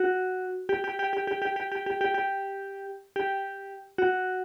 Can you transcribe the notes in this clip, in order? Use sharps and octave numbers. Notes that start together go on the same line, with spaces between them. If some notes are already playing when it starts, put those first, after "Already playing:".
Already playing: F#4
G4
G4
G4
G4
G4
G4
G4
G4
G4
G4
G4
G4
F#4